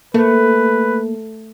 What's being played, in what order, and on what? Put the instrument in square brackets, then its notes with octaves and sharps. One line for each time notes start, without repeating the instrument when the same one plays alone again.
[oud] A3 [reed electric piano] A#3 [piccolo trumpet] B4